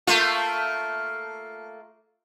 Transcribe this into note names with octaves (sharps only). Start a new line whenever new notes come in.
A3 A#3 F4